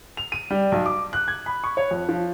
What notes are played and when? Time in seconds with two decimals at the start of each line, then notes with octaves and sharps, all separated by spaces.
0.17 F7
0.32 D#7
0.51 G3
0.72 B1
0.86 D6
1.13 F#6
1.28 G#6
1.46 B5
1.64 C#6
1.77 C#5
1.91 F2
2.09 F3